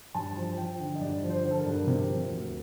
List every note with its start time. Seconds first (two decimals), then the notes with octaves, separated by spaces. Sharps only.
0.15 G2 A5
0.36 F3
0.57 F3 G5
0.80 D3
0.95 D#5
1.01 G2 D5
1.22 F3
1.30 C5
1.44 D3
1.51 A4
1.59 A#4
1.66 G2
1.87 C3
2.09 F3
2.30 D2